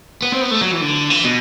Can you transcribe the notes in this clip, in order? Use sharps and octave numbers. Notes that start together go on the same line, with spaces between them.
B3
C4
B3
A3
F#3
E3
D3
E3
B2